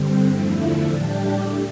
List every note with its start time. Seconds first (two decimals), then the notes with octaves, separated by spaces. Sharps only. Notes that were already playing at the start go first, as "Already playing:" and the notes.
Already playing: G2 D3 G3 C4
0.32 E2 D3 F3 A3 E4
0.87 A2 G3 D4 G4
1.41 D3 A3